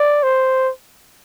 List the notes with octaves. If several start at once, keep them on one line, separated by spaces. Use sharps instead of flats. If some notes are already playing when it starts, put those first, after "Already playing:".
Already playing: D5
C5